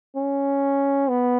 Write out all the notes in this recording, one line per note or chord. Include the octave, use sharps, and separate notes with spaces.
C#4
B3